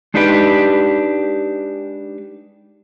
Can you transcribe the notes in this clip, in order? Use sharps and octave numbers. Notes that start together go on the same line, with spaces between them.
G#3 D4 D#4 G4 B4 G5